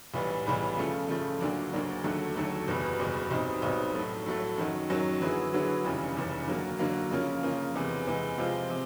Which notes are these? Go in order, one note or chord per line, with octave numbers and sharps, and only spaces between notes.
B1 A2 E3 G3 B3
B1 A2 E3 G3 B3
C#3 F3 A3
C#3 F3 A3
D2 D3 F#3 A#3 D4
D2 D3 F#3 A#3 D4
D#2 D3 F#3 A3
D#2 D3 F#3 A3
F#1 E2 B2 G3
F#1 E2 B2 G3
B1 B2 G3 C4 D#4
B1 B2 G3 C4 D#4
A2 F#3 A3
A2 F#3 A3
F#2 D#3 F#3
F#2 D#3 F#3
D3 F#3 B3 E4 G#4
D3 F#3 B3 E4 G#4
F1 D#2 C#3 E3 G3
F1 D#2 C#3 E3 G3
D3 F#3 A#3
D3 F#3 A#3
C#3 F3 A#3 C#4
C#3 F3 A#3 C#4
E2 C3 E3 G#3 B3
E2 C3 E3 G#3 B3
C3 F3 G#3 C4 F4
C3